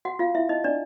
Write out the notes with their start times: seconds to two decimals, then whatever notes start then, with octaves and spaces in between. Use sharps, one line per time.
0.05 F#4 F#5
0.19 F4 F5
0.35 E4 E5
0.49 D#4 D#5
0.64 D4 D5